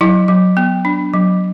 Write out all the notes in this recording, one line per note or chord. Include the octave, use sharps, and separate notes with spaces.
F#3 E4
F#3
B3
D4
F#3